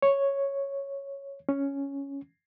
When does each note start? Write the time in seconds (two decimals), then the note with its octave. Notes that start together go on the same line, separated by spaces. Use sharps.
0.02 C#5
1.49 C#4